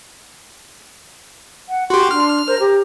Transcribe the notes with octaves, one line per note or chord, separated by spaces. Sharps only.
F#5
F#4 G4 C6
D4 F6
A#4 C5
G4 A#5